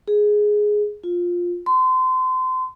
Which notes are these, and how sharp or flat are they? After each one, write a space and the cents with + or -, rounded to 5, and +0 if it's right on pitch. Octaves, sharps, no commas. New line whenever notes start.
G#4 +5
F4 +10
C6 -30